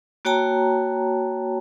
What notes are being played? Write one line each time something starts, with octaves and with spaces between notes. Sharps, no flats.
A#3 F#4 C#5 G5 A5 A#5